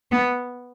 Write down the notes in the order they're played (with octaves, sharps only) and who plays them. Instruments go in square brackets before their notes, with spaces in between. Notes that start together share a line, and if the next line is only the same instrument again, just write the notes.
[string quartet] B3